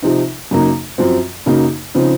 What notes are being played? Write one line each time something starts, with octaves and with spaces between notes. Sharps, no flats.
C3 F3 C4 D#4
F#2 C#3 F#3 A#3 D#4
F#2 F3 C4
F#2 C#3 F#3 A#3 D#4
C#3 F3 C4 D#4